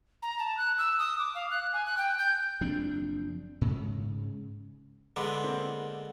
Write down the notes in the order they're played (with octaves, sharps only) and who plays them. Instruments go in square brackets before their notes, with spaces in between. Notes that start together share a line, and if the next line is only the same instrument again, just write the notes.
[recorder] A#5
A5
F#6
E6
D#6
D6
F5
F#6
G#5
F#6
G5
G6
[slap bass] F#1 F3 C4 D4
G#2 C#3
[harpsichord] D3 G#3 B3 [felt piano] B5 C6 D6
[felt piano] A#3 C4